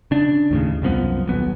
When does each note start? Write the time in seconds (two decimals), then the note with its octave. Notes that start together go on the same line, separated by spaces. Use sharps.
0.11 C#3 D4
0.51 D#2 A2 C#3
0.82 C2 F#2 F3 B3
1.26 D#1 B1 B3